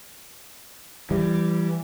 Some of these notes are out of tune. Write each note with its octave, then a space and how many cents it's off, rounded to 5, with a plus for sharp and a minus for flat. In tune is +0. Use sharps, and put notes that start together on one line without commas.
E3 +25 G3 -5